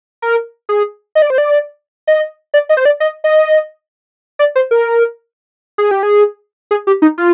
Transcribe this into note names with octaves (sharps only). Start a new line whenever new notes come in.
A#4
G#4
D#5
D5
C5
D5
D#5
D5
D#5
C5
D5
D#5
D#5
D5
C5
A#4
G#4
G4
G#4
G#4
G4
D#4
F4